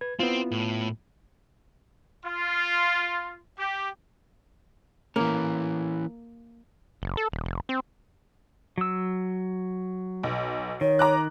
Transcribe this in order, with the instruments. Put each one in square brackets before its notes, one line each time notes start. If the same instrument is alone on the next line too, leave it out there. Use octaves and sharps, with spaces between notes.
[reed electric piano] B4 G#6
[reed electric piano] B3 E4 F4 [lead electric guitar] C4
[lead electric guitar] A2
[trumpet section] F4
G4
[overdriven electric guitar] E3 C#4 [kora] A#3
[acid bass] F#1
A4
D#1
F1
C4
[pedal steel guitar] F#3 E6
[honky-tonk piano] B1
[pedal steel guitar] D#3 [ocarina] C#5
[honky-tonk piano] A#5 D6 F#6